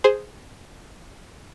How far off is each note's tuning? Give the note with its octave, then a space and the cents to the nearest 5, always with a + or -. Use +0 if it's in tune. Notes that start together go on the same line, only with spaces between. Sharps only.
G#4 +0 C5 +0